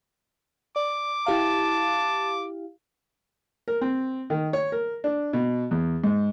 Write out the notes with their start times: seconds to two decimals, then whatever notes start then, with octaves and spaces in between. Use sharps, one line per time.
0.76 D5 D6
1.26 E4 G4 F5 A5
3.68 A#4
3.81 C4
4.30 D#3
4.53 C#5
4.72 A#4
5.04 D4
5.33 B2
5.71 E2
6.04 G#2